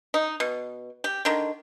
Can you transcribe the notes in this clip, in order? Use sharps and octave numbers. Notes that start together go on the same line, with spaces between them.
D#4
B2
G4
D3 D#3